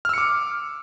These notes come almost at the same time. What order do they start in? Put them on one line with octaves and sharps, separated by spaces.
F6 E6 C#7 D6